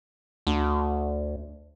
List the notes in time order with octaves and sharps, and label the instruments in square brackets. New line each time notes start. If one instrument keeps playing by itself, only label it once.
[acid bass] D2